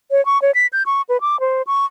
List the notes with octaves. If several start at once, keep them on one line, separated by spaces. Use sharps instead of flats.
C#5
C#6
C#5
B6
G6
C#6
B4
D6
C5
C#6